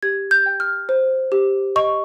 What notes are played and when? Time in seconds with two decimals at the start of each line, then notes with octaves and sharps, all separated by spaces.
0.03 G4 G#6
0.31 G6
0.46 G5
0.60 F6
0.89 C5
1.32 G4
1.76 D#5 C#6